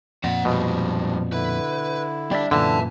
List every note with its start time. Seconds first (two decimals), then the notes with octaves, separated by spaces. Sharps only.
0.24 F2 A#2 C5 F#5
0.45 G#2 B2 F3 G3
1.33 D3 E4 B4
2.31 G3 D4 D5 E5
2.51 F#2 A#2 D3 E3 E5 G5 A5